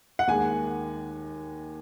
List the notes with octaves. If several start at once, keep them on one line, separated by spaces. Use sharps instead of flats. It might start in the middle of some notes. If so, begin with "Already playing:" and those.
F#5
D#2 D#3 G#3 G#5